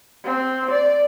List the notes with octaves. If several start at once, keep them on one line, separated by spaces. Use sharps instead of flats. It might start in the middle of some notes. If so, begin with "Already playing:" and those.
C4
D5